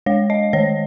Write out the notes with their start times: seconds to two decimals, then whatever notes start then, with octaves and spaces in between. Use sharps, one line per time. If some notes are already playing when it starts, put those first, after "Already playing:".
0.06 G#3 C#5
0.30 D#5
0.53 D#3 C#5